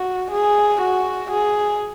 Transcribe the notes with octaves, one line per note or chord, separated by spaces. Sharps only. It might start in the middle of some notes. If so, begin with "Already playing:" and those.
Already playing: F#4
G#4
F#4
G#4